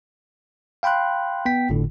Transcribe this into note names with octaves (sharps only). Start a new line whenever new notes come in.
F5 G5 B5 C6 F#6
B3 G5 B6
G1 A2 D3